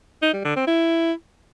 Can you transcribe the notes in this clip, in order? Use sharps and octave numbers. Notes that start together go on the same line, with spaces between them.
D#4
G3
D3
C4
E4